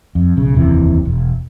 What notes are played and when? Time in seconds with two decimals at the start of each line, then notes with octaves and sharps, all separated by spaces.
0.15 F2
0.37 B1 C#3
0.55 F1 D#2 C3 E3
1.05 E1